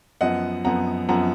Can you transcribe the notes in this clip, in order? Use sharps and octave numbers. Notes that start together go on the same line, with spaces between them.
F#2 F3 B3 D#5 F#5
F#2 F3 B3 F#5 A#5
F#2 F3 B3 F#5 A#5